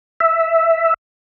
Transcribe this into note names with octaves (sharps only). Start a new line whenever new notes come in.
E5